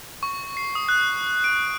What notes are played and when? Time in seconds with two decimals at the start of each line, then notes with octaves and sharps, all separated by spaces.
0.23 C#6
0.57 C7
0.75 D#6
0.89 F#6
1.44 D7